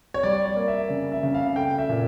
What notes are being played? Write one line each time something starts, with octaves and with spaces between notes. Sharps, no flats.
C#5
G3 D5
D5
A#3
E5
C#3
E5
C#3
F5
A3 G5
E5
A#2